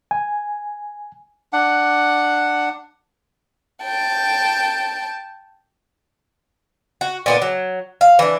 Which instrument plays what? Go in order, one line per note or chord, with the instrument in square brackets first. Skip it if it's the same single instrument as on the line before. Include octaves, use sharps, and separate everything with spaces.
[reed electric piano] G#5
[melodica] D4 F#5
[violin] G5 A5
[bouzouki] F#4
A#2 B3 D4
F#3
F5
E3 D4